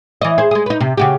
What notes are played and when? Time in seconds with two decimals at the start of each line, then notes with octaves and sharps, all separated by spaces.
0.21 E3 D#5
0.38 G#4 C5
0.51 G#3 G#4
0.66 D#4 B4
0.80 C3
0.97 C#3 F#4 G4